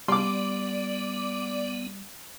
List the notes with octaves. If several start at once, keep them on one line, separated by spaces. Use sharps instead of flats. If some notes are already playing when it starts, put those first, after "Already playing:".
G3 B3 D5 C6 D6